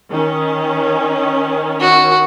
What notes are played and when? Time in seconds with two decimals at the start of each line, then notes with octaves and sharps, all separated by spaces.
0.11 D#3 C#4
1.81 F#4